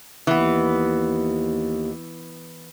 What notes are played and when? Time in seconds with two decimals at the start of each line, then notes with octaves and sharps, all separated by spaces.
0.27 D#2 E3 B3